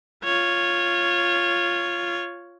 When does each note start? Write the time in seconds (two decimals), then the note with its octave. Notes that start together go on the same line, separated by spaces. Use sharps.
0.25 F4 C#5